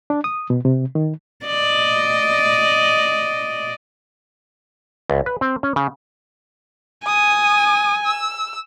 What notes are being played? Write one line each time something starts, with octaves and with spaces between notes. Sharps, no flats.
D4
D#6
B2
C3
D#3
D5 D#5
C#2
B4
C4
C#4
C#3
G#5 D#6
E6